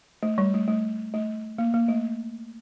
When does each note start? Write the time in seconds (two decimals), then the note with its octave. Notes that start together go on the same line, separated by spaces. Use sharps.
0.23 A3
0.38 G3
0.54 A3
0.68 A3
1.14 A3
1.58 A#3
1.74 A#3
1.89 A3